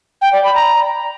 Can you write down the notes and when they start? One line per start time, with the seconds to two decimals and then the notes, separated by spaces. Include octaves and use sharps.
0.21 G5
0.33 D5
0.44 B5
0.55 A#5